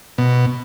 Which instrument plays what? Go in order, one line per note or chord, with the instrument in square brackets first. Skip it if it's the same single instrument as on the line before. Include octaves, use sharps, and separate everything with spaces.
[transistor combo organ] B2